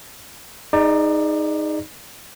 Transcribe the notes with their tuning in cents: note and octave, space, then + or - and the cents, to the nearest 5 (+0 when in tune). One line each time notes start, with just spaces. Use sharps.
D#4 +0 G#4 +0 D5 +25